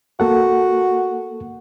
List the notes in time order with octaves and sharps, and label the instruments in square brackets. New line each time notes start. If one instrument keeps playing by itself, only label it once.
[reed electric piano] A#3 A4 F#5 [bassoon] F#4